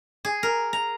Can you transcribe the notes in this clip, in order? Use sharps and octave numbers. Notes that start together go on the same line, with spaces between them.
G#4
A#4
A#5